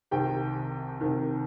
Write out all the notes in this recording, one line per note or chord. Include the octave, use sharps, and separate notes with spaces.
C2 C3 D#3 G4 G5
C2 C3 D#3